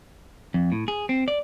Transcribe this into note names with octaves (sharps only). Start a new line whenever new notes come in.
F2
A2
G#4
C4
D5